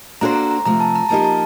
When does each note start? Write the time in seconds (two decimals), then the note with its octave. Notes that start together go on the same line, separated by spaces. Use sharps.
0.21 A#3 D4 F#4 A4 C5 A#5
0.36 A#5
0.51 A#5
0.65 C3 F3 A3 A#5
0.80 A5
0.95 A#5
1.09 F3 A#3 D#4 G4 A5
1.25 A5